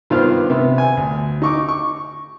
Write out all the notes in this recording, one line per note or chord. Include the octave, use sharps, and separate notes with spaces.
G2 D#3 B3 F4 C5 F6
C3 B3
G#5
D2
D#4 C#6 D6
C#6